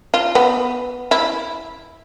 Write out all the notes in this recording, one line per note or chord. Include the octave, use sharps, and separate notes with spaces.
F4
B3
E4